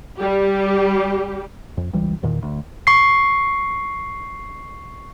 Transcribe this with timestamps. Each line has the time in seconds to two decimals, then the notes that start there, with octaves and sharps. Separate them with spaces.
0.17 G3 G4
1.77 F2
1.93 C#2 E3 G3
2.23 E2 A#2 D#3
2.43 D2
2.87 C#6 C7